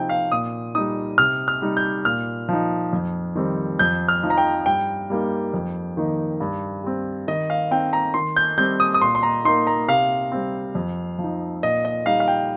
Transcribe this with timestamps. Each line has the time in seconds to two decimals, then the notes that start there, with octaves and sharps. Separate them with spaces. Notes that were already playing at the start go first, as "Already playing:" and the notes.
Already playing: C3 F3 C4 D#4 G5
0.09 F5
0.32 A#2 D#6
0.75 G3 D#4 D#6
1.18 C3 F6
1.48 F6
1.62 G3 D#4
1.77 G6
2.05 A#2 F6
2.49 F3 D#4
2.93 F2
3.35 D#3 G3 C4
3.79 F2 G6
4.08 F6
4.23 F3 D#4
4.30 A#5
4.38 G5
4.66 G2 G5
5.10 G3 A#3 D#4
5.54 F2
5.97 D#3 A#3 D#4
6.40 G2
6.84 G3 C4
7.28 D#3 D#5
7.50 F5
7.71 C4 D#4 G5
7.93 A#5
8.14 D#3 C6
8.36 G6
8.58 G3 C4 G6
8.80 D#6
8.94 D#6
9.02 A#2 C6
9.15 C6
9.23 A#5
9.45 A#3 D#4 C6
9.67 A#5
9.88 C3 F5
10.32 G3 C4
10.75 F2
11.19 F3 D#4
11.63 A#2 D#5
11.85 D#5
12.06 G3 D#4 F5
12.20 F5
12.28 G5